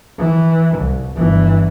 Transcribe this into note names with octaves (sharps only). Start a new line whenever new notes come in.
E3
C2
G1 E3